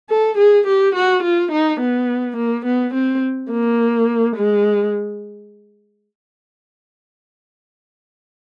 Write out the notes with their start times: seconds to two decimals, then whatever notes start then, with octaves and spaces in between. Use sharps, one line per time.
0.09 A4
0.38 G#4
0.66 G4
0.95 F#4
1.23 F4
1.51 D#4
1.80 B3
2.37 A#3
2.65 B3
2.93 C4
3.50 A#3
4.36 G#3